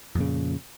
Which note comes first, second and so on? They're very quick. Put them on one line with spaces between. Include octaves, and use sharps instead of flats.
F2 A#2 C#3